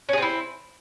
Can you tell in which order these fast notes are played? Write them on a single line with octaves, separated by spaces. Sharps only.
C#4 G#4 C4 E4